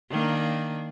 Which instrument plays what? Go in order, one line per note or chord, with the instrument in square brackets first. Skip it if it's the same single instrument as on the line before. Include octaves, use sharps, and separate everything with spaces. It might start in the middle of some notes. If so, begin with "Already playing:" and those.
[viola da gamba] D#3 A#3 D4